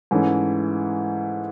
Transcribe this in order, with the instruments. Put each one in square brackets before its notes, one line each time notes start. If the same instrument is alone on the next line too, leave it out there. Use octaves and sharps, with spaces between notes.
[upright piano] G#2 E3 A3 C#4